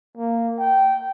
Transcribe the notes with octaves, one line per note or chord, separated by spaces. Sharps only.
A#3
G5